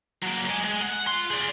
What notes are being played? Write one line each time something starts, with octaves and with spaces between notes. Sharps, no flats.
F#3 A#3
G#3 G#5
G#3
F#5
F4 C6
G#4 D5